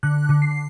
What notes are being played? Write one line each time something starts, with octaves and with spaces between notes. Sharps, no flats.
D3 F#6
D3
C7